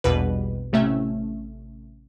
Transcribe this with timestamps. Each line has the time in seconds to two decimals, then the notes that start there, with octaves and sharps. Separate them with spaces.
0.04 A#1 E2 B2 G3 B4
0.72 A1 C3 A3 C#4 E5